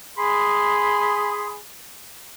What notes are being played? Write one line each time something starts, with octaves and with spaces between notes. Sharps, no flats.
G#4 B5 C6